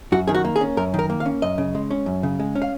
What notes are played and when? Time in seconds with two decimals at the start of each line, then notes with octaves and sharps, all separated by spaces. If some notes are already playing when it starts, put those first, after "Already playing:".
0.12 F#2 F#4
0.28 D#3 G#4
0.34 F#4
0.45 A#3
0.56 G#4
0.61 C#4
0.77 F#2 A#4
0.94 D#3
0.99 A#4
1.10 A#3
1.20 F5
1.26 C#4
1.42 F#2 D#5
1.58 C#3
1.75 G#3
1.91 C#4
2.06 F#2
2.23 C#3
2.39 G#3
2.55 C#4
2.62 F5